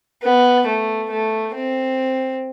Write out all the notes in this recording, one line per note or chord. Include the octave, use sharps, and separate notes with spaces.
B3
A3
A3
C4